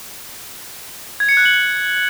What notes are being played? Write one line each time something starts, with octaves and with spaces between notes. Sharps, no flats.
G#6
C#7
F#6
F#7